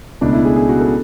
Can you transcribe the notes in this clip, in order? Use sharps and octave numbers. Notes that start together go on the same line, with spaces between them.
C#2 B2 A3 D4
E4
G#4
G#4
F#4
A4